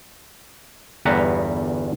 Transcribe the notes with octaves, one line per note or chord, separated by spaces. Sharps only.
G1 E2 G3 B4 F#5 A#5